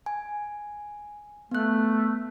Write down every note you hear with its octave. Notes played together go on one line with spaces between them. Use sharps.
G#5
A3 B3 F#6